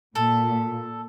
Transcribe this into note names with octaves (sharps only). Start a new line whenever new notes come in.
A#2 A4